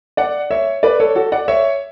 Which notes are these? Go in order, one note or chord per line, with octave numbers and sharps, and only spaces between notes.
D5 F#5
C#5 E5
B4 D5
A4 C#5
F#4 A4
D5 F#5
C#5 E5